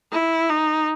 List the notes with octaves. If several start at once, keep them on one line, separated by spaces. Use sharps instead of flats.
E4
D#4